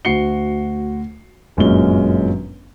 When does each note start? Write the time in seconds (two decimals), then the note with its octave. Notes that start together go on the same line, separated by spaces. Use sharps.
0.05 D2 F#4 C7 C#7 G7
1.57 G1 F#2 A#2 G#3 C#4 G7